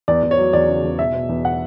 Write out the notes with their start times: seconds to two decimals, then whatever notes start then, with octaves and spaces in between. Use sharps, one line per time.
0.08 E2 D5
0.23 E2
0.31 C#5
0.38 F#3
0.53 E2 D5
0.69 C#3
0.84 E2
0.99 B2 E5
1.14 B2
1.29 E2
1.45 F#5